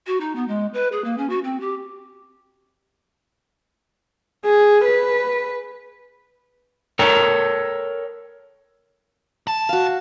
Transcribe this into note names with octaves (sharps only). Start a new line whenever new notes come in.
F#4
D#4
B3
G#3
B4
G#4
A#3
C#4
F#4
C4
G4
G#4
B4
A4 A#4 C#5 G5 A#5
B1 A5
F#4 F5